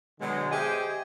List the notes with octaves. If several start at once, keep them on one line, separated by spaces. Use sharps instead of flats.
B2 D3 F#3 G#3
G4 G#4 C5 D#5 E5 G#5